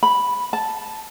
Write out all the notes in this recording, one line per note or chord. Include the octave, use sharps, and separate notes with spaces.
B5
A5